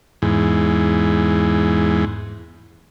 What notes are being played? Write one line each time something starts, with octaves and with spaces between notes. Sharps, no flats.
E2 G#2